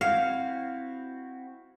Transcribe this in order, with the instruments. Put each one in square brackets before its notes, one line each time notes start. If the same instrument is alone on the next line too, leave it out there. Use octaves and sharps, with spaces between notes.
[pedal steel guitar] C4 E4 F#4 [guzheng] F5